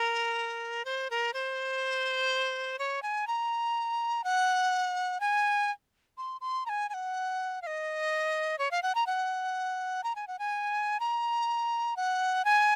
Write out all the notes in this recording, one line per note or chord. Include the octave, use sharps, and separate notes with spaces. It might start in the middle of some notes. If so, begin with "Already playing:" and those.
Already playing: A#4
C5
A#4
C5
C#5
G#5
A#5
F#5
G#5
C6
C6
A#5
G#5
G#5
F#5
F5
D#5
C#5
F5
F#5
A#5
F#5
A#5
G#5
F#5
G#5
A#5
F#5
G#5